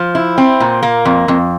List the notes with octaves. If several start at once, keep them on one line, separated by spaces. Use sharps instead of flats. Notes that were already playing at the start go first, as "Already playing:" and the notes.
Already playing: F3
E4
C4
A#2
A#3
F2
F2